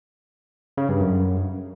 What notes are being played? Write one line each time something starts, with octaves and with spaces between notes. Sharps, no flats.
C#3
G2
F#2